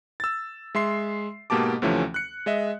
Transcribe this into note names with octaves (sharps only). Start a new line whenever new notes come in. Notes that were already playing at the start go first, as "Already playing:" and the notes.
E6 A6
G#3 E5 C6 C7
G#2 B2 A#3 G4 A5 D6
D2 C3 E3 F3 A3 C#4
F#6 C#7
G#3 D#5 E5